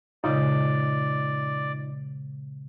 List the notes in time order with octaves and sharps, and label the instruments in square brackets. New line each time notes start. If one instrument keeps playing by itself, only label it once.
[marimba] A#2 C#3 G#3 [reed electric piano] D#4 F4 D#5 [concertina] D5